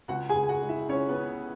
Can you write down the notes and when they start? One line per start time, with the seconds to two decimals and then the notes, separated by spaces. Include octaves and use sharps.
0.08 C#2 F#4 F#5
0.29 G#4 G#5
0.35 C#2
0.44 G#5
0.49 F#4 F#5
0.62 G#3
0.69 E4 E5
0.88 C#2 C#4 C#5
1.09 B3 B4
1.15 C#3